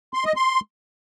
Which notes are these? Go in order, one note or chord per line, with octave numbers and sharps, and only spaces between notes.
C6
D#5
C6